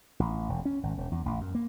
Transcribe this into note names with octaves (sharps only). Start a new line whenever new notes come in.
A1
E1
C#4
G#1
E1
E2
A1
F#2
A#3